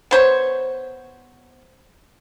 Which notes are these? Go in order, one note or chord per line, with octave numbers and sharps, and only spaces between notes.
B3 C5 C#5